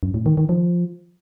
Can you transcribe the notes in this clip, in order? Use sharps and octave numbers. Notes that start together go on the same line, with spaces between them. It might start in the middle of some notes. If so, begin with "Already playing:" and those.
F#2
A2
D#3
D#3
F3